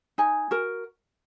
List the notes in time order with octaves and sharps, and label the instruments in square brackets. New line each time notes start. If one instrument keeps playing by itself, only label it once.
[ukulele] D#4 G#5
F#4 A#4